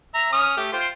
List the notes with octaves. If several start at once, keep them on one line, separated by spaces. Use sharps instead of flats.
E5 A#5
C#4 D#6 F6
A3 G4
F4 C5 G5